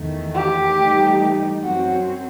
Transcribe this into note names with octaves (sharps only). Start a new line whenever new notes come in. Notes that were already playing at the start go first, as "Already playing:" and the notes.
Already playing: E2 D#3 A3
G4
G2 E3 A3 D#4
F#2 F#3 C4 F#4